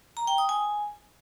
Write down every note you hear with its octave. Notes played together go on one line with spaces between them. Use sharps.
A#5
G5
D#6
G#5